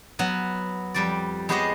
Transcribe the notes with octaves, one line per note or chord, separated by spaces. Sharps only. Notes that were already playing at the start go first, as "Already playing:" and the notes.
F#3 B3 B4
F2 G3 D5
G#3 B3 G4 C5 C#5 D#5